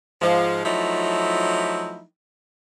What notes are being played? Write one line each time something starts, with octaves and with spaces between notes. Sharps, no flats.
G#2 F3
F3 F#3 A3 D#4 E4